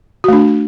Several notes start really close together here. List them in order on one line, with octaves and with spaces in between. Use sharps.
F#4 A3 D4